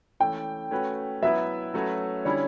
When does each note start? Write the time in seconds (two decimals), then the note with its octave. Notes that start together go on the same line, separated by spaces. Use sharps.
0.20 E3 A3 C#4 G5
0.71 A3 C#4 F#4 B4
1.22 F#3 B3 E4 B4 E5
1.74 F#3 A3 C#4 F#4 B4
2.25 D3 G3 C#4 E4 C#5